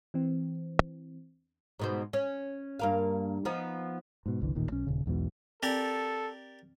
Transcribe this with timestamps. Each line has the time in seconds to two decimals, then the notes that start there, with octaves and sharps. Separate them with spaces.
0.14 C3 E3 G3 C4
0.53 D#1 C#2
0.82 E2 D4
1.79 G#2 B2 C5
2.13 C#4
2.79 G2 A#3 F5
3.45 F3 B3 D#4
4.26 G#2 B2
4.41 F#1 C2 D3 E3
4.55 D#1 A1 A#2 D#3
4.72 B1 C#4
4.87 D#1 C#3
5.06 B1 E2 G#2 B2
5.63 C4 G4 A4 A#4 D5